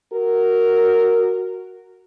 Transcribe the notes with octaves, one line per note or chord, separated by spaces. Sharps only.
F#4 A#4